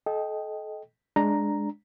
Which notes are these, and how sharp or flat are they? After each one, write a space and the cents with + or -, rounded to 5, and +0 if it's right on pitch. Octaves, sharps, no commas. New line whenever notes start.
A4 -30 D#5 +5 G5 +0
G#3 +0 D4 +0 A#5 +0